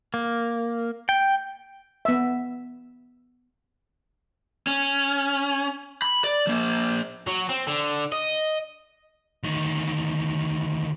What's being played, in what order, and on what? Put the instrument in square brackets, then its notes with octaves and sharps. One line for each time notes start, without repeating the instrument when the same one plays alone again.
[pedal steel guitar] A#3
G5
[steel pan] B3 E5
[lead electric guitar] C#4
B5
D5
F3 A#3
[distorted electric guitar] F#3
C4
D3
D#5
[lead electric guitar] D2 D#3